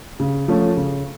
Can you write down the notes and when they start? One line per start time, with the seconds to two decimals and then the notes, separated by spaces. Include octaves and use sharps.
0.20 C#3
0.48 F3 A3 C#4
0.77 C#3